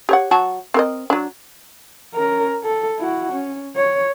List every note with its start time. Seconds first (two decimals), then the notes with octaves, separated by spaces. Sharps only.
0.09 G4 C#5 F#5
0.31 F#3 F#4 A5
0.74 C4 A#4 D#5
1.10 F#3 D4
2.15 C#4 A#4
2.64 A4
2.99 E4 F#4
3.33 C#4
3.76 C#5